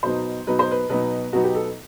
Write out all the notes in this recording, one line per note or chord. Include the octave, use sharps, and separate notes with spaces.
B2 F#3 B3 D#4 C5
B2 F#3 B3 D#4 B4
C5
B4
B2 F#3 B3 D#4 B4
B2 F#3 B3 D#4 F#4
G4
A4